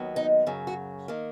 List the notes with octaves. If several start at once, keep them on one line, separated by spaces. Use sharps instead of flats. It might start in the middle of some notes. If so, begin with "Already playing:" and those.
Already playing: D#2 D#3 F#3 B3
D#4
F#2 C#3 F#3
F#4
D#3 A#3